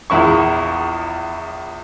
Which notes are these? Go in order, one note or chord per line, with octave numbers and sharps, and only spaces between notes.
A#1 E2 E4 C#6